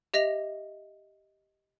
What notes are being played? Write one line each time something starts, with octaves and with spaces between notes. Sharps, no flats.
G4 D#5 E5 A#6 F7